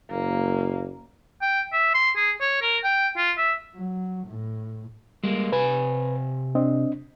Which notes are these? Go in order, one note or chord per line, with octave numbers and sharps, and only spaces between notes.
F#1 A#3
G5
E5
C6
G#4
C#5
A#4
G5
F4
E5
F#3
A2
G3 G#3 A#3
C3 B4 G#5
C4 D4 D#5